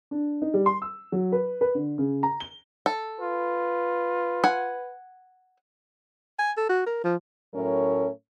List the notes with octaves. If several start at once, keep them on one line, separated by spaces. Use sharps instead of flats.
D4
D#4
G3
C6
E6
F#3
B4
B4
D3
C#3
A#5
G7
A4
F4 B4
F#5 G#5
G#5
A4
F#4
A#4
F3
A2 F#3 A3 C#4 A#4 C#5